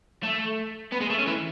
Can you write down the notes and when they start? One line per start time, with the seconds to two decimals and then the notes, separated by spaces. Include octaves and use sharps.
0.23 A3
0.92 B3
1.01 G#3
1.10 A3
1.18 C#4
1.27 E3